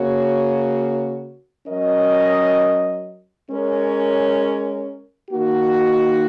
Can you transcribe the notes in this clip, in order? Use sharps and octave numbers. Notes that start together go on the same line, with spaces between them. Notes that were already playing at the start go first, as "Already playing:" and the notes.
Already playing: C#3 A#3 F#4 C#5
F#3 C#4 A#4 D#5
G#3 C#4 A#4 C#5
D#3 A#3 D#4 F#4